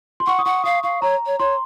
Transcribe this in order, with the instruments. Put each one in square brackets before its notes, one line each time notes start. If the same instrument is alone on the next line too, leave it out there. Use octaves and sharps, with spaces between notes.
[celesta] C6
[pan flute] F#5 [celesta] C#6
[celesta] D#6
[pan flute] F#5 [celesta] C#6
[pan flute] F5 [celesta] D#6
[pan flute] F5 [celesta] C#6
[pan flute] C#5 [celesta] A#5
[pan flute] C#5
[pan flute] C#5 [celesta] C6